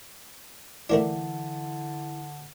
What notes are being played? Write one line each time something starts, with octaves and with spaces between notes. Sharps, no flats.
D3 E3 A3 A#3 D4